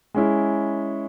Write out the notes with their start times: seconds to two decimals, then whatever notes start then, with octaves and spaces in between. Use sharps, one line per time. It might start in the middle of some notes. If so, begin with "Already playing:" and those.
0.14 G#3 C#4 E4